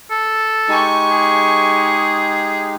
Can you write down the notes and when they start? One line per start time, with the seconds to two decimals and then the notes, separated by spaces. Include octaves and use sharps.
0.10 A4
0.69 G#3 D#4 G4 G#5 C#6
1.11 G#4